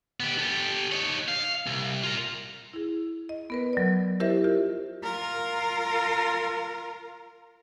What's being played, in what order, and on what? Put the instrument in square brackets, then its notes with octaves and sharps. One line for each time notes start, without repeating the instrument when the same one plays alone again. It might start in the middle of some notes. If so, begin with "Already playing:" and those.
[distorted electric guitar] B3 G4
G4 A4
D#4 C#5
F5
C2
F4 A#4
[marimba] E4 G#4
D#5
B3 A#4 B4
F#3 D5
E4 G4 A#4 C5 D#5 E5
F4 G4
[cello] F4 A#4